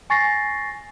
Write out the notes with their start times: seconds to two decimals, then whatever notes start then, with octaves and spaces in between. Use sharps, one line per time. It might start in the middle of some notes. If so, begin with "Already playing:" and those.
0.10 G#5 C#6 A6 A#6 C7